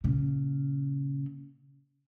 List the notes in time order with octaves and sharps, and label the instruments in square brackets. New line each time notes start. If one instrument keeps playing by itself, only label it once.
[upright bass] A#2 C#3